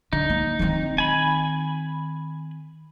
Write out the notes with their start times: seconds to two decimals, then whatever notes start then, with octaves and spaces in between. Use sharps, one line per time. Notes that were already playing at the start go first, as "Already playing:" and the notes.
0.13 D3 D#4
0.30 A#3
0.59 D#3 C4
0.98 G#5 B5